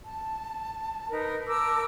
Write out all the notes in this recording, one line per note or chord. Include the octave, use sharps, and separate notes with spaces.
A5
D#4 A#4 B4
A#4 A5 D6 E6